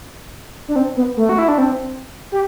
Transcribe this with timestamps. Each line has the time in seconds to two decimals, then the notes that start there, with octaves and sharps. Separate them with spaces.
0.68 D4
0.76 C4
0.96 B3
1.17 A3
1.29 F#4
1.38 E4
1.48 D4
1.58 C4
2.32 G4